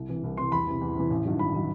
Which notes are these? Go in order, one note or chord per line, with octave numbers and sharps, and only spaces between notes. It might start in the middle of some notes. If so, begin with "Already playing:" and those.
Already playing: C2
C3 E3
C2
C3 E3 C6
E2 B5
C3 E3
E2
C3 E3
A1
G2 D#3 F#3
A1 B5
D#3 F#3